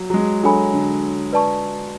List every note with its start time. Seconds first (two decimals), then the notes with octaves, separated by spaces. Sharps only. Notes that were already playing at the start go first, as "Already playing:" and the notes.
Already playing: F#3
0.10 F#3
0.14 G#3
0.43 F#3 D4 A4 C#5 G#5 B5
0.73 D3
1.33 B4 D5 A5 C#6